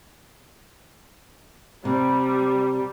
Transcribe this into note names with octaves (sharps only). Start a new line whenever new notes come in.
C3 G3